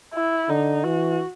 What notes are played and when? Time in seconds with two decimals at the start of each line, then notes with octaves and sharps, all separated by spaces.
0.14 E4
0.49 D3 D#4
0.84 E3 F#4